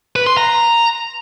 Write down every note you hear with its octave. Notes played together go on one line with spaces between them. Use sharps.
B4
C6
A#5